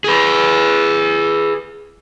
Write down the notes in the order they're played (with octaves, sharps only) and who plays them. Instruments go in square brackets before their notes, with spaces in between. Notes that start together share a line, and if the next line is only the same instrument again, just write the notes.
[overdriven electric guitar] G#4 B4